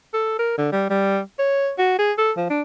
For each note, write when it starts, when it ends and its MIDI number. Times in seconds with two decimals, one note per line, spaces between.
0.14 0.38 69
0.39 0.55 70
0.58 0.70 50
0.72 0.87 55
0.90 1.20 55
1.39 1.72 73
1.78 1.97 66
1.98 2.12 68
2.18 2.32 69
2.37 2.45 53
2.50 2.62 62